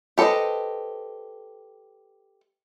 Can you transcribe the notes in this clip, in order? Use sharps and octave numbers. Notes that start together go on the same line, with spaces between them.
G4 A4 B4 C5 D#5